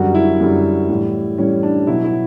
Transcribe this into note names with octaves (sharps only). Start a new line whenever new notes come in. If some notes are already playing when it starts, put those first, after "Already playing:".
Already playing: F#2 D3 G3 F#4
E4
F#2 D3 G3
A2 E3 G3
A2 E3 G3 C#4
D4
B2 F#3 E4
E4